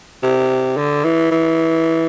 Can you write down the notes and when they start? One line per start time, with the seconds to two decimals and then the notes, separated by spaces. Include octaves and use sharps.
0.23 C3
0.77 D3
1.04 E3
1.31 E3